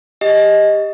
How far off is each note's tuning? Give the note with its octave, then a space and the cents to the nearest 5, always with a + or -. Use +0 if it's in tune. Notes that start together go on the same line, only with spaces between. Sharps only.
G4 +25 D#5 +5